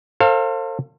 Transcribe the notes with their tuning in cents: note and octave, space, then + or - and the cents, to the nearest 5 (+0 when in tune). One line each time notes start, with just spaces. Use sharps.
A4 +40 C5 +30 F5 +0